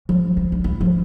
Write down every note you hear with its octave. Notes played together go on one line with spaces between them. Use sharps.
F3
F3
D4
E4
F3